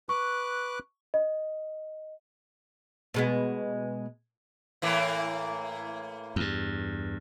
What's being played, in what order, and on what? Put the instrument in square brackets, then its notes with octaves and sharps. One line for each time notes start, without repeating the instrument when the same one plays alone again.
[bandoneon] B4 D6 F#6 [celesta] C#6
[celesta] D#5
[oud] B2 G#3 B3
[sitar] A2 E3 A#3
[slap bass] E2 G2